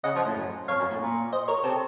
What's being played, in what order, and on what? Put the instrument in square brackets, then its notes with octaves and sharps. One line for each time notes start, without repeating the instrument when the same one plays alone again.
[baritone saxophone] C#3 [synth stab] D#5 F#5
[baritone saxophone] F3
A2
F#2
[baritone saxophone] F2 [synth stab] C#5 F5
[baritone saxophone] F#2
A2
A#2
[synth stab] C5 D#5
A#4 C#5
[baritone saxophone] C3 [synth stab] A4 C5